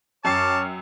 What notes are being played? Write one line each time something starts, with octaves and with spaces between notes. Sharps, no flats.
F#2 C#5 G5 A5 C#6 D6 F6 C7